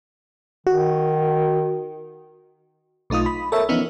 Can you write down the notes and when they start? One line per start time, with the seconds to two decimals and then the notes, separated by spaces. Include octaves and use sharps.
0.67 D#3 F#4
3.10 B1 A3 D#4 F4 D#6
3.26 B5
3.52 A4 A#4 C#5 E5
3.69 E3 F3 B3 C#4 D#4